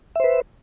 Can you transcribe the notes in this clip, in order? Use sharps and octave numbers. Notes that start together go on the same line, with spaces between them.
B4 C5 E5